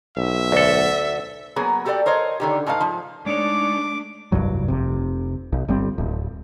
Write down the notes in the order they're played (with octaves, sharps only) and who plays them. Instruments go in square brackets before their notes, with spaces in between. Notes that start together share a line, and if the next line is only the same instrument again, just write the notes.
[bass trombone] B1 [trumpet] E5
[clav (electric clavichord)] D2 A4
[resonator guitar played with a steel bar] F#3 A#3 B3 G#4
F#4 G4 A4 B4 D5 G5
A#4 C5 C#5 D#5
D3 D#3 G4
G#2 A3 D#4 B4 F5
G#2 F3
[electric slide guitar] G#3 D#4 C#5 [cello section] A3 D4 [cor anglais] D5 [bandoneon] D6
[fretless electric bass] F1 C2 G2 F#3
F1 C3
B1
G1 G3 C4
D1